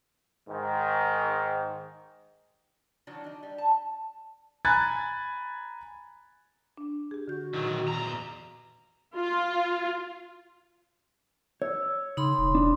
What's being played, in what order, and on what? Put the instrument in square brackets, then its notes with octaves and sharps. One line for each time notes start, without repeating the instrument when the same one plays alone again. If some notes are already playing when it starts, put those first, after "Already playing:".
[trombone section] G#2 D#3
[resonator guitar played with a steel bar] D#3 E3 F#3 D4
D4 D#4
G3
A5
[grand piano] G#5 A#5 B5 F#6 G#6 A6
[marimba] D4
G4 G#4
[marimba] D3 G6 [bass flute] F#4
[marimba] A#2 [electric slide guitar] D#3 F#3
[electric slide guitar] E2 A#5
[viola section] F4
[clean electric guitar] C#5 [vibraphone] E6
[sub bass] C#3 [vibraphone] D#4 B5 C6
[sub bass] E1
[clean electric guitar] D4